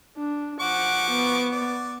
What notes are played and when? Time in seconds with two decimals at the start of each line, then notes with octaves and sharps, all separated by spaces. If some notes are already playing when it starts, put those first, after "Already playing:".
0.17 D4
0.60 F3 F#5 C#6 D6
1.10 B3
1.53 D5